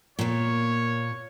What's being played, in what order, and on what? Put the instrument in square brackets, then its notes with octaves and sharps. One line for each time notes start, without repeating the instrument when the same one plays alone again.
[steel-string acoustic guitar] A#2 A#3 [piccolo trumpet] C#5